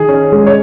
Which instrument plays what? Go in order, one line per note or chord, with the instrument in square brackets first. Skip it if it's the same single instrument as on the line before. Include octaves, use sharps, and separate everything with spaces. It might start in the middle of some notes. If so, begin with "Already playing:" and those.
Already playing: [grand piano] D#3 G#4
C#4
G#3
C#5